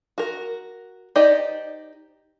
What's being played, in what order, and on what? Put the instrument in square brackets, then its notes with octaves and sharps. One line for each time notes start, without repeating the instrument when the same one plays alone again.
[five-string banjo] F#4 A#4
D#4 G4 C5 D5 D#5